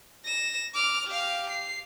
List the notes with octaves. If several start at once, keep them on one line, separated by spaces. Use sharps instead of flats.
A#6 E7
D6 F6
G4 F5
C7